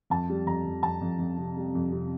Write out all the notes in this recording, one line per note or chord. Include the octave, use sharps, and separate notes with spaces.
F2 A5
G3
F2 A#5
F2
F2 A5
F2
F2
C3
G3
F2
C3